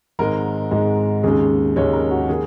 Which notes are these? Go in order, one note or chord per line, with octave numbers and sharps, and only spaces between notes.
G#1 G#2 G#3 A#4
G#1 G#2 G#3
D#2 C#3 G#3 G#4
D#2 C#3 G#3 C#5
A#4
F#4
D#3 A#3 G#4